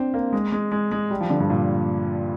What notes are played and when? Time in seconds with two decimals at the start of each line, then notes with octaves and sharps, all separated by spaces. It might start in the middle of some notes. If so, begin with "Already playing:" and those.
Already playing: C4 D4
0.14 A#3
0.33 G#3
0.52 G#3
0.72 G#3
0.91 G#3
1.10 G3
1.21 F3
1.30 D3
1.40 G2
1.50 A#2